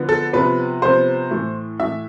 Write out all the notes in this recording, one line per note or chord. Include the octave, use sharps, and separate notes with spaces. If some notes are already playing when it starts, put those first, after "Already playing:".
Already playing: D3 F3 B3
A4
C3 F3 B3 B4
C3 F3 B3 C5
A2 E3 A3
A2 E3 A3 E5